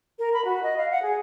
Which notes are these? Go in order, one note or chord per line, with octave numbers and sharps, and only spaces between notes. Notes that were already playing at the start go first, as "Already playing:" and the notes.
A#4
B5
F#4
D#5
F5
F#5
G#4